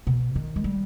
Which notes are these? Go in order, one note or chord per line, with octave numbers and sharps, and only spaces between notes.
B2
D#3
G#3
G3